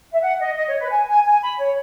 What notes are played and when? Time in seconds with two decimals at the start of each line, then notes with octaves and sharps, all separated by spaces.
0.12 E5
0.21 F#5
0.39 D#5
0.56 D#5
0.67 C#5
0.79 B4
0.90 G#5
1.08 G#5
1.25 G#5
1.41 B5
1.59 C#5